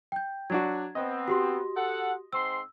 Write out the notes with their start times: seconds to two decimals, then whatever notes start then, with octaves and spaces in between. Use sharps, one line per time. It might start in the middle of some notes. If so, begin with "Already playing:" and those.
0.12 G5 G6
0.50 F#3 D4 F#4 G#6
0.95 B3 C4 D#5
1.28 F#4 G4 C6
1.75 A4 F#5
2.33 G#2 C4 C6 E6